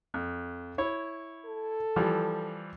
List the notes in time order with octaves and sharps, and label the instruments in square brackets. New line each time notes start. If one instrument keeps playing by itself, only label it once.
[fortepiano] F2
E4 C#5
[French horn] A4
[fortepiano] E3 F3 G3